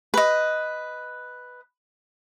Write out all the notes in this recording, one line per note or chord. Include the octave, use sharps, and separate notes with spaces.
B4 D#5